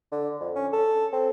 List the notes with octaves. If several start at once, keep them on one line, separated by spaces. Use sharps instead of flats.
D3
F2
C#4
A4
C4